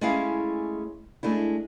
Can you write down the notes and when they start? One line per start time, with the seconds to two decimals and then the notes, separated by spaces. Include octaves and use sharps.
0.01 G#3 A3 C#4 E4 G#4 F5
1.23 G#3 A3 D4 E4